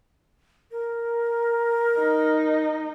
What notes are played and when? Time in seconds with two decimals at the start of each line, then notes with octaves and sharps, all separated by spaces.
0.72 A#4
1.99 D#4